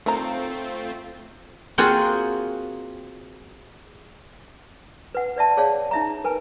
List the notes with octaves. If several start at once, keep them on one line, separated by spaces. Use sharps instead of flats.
D#3 F#3 A3 C4 F4 A#5
A#3 C4 F4 F#4 G#4 F#5
B4 F#5
B4 D5 E5 A5
G#4 C#5 D5 F5 A5
D#4 E5 A#5
A#4 B4 G#5